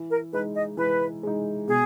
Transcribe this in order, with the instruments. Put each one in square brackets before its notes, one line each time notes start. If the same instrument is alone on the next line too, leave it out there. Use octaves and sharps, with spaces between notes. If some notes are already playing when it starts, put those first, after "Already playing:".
Already playing: [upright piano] E3
[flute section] A#4
[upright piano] G#3 D#4 [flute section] B4
[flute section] D#5
[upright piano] E3 [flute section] B4
[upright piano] G#3 D#4
[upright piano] B2 [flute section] G#4